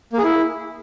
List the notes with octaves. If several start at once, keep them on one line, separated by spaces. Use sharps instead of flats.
A#3
G#4
E4